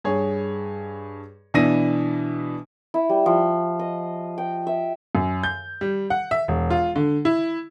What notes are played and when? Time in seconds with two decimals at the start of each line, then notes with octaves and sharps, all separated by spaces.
0.05 G2 G#4 C#5
1.54 B2 E3 D4 E5 A#6 D#7
2.94 E4
3.09 G3
3.26 F3
3.79 D#5
4.38 G5
4.67 E5
5.15 F#2
5.43 G6
5.81 G3
6.10 F#5
6.31 E5
6.48 E1
6.70 F4
6.96 D3
7.25 E4